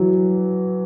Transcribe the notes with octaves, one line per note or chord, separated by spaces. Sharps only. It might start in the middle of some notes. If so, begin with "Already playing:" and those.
Already playing: E3 F#3